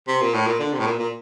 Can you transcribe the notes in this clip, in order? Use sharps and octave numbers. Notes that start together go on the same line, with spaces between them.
C3
A#2
A2
A#2
D3
C3
A2
A#2
A#2